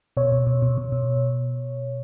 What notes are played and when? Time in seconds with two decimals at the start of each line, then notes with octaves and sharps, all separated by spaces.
0.17 B2 C#5
0.32 B2
0.47 B2
0.62 B2
0.78 B2
0.92 B2